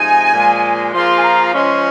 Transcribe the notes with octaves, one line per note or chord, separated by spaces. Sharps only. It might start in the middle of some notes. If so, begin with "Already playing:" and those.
Already playing: C3 F3 G#3 D#4 G#5
A#2 F3 G#3
F3 A#3 F4 G#4 C6
G#5
A#5
F3 G#3 C#4 C6